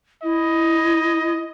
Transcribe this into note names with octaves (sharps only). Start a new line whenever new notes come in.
E4 D#5